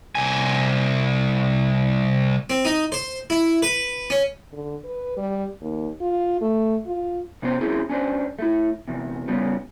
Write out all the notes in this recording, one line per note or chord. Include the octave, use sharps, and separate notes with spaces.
C2 G#5
C4
D#4
C5
E4
B4
C#4
D3
B4
G3
D#2
F4
A3
F4
C3 B3 C#4 G4 C5
C4 C#4 E4 G4 G#4
C#4 D4 B4 C5
A3 E4
E2 C3
C#3 G3 B3 C#4